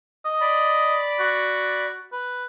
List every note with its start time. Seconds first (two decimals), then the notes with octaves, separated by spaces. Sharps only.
0.25 D#5
0.41 D5 B5
1.20 F#4
2.13 B4